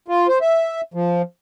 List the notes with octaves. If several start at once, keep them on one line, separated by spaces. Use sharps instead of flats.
F4
C5
E5
F3